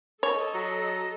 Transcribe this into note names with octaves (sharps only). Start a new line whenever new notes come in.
A4 C#5 D#5
F#3 A#5